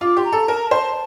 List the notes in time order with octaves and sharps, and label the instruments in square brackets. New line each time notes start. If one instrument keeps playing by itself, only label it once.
[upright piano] F4 [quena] D6
[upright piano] G4 [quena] C6
[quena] A#5
[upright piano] A4
[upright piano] A#4 [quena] A5
[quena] A#5
[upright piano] C5 [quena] A5